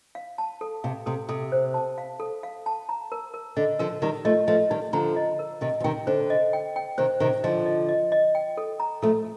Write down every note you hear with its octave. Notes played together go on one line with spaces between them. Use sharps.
F5
A5
A4
C3 F5
C3 A4
C3 A4
C5
A5
F5
A4
F5
A5
A#5
A#4
A#4
D3 D#5
D3 F3 A#4
D#3 G3 D#4
F3 A3 D#5
F3 A3 D#5
D#3 G3 D#4
D3 F3 A#5
D#5
A#4
C3 D#3 D#5
F3
C3 D#3 G5
D3 C5
D#5
G5
G5
C3 D#3 C5
C3 D#3 C5
D3 F3 D#5
D#5
D#5
D#5
G5
A4
A#5
F3 A3 A4